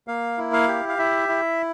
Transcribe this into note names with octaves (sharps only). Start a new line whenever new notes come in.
A#3 F5
E4
F5
G4
F5
E4 E5
E4